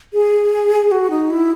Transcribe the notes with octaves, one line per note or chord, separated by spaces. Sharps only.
G#4
F#4
D#4
E4